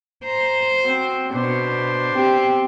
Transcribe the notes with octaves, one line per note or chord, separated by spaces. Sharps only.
C5 A#5
C4 F#4
B2 D4 C5
C4 G4